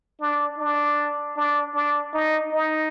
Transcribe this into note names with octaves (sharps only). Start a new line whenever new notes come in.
D4
D4
D4
D4
D#4
D#4